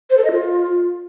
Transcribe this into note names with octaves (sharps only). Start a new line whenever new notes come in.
C5
A4
D#5
F4